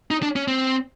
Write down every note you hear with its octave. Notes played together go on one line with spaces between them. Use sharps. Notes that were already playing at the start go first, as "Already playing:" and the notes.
D#4
D4
C#4
C4